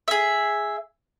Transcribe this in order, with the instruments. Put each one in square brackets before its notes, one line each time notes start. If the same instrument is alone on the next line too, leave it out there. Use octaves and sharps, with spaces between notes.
[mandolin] G#4 E5